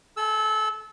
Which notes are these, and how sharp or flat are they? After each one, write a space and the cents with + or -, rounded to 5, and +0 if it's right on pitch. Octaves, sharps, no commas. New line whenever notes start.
A4 -25 G#5 +0 E6 +0